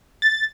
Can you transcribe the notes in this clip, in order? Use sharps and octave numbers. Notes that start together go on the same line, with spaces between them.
A6